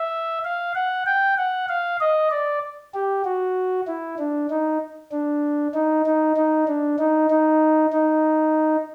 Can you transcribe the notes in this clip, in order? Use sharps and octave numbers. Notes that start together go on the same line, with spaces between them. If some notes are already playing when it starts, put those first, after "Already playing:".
Already playing: E5
F5
F#5
G5
F#5
F5
D#5
D5
G4
F#4
E4
D4
D#4
D4
D#4
D#4
D#4
D4
D#4
D#4
D#4